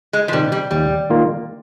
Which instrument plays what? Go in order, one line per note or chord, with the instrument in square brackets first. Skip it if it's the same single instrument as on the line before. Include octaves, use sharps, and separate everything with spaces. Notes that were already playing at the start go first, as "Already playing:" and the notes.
[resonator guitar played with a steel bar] G#3
F3
[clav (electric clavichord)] C3 D#3 [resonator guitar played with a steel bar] G3
[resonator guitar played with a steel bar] G3
[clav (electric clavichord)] D#2 [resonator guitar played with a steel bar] G3
[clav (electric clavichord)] D#3 A#3 F4